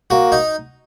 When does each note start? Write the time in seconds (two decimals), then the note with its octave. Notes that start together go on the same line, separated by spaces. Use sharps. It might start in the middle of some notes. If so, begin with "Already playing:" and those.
0.10 A#3 F#4
0.32 D#4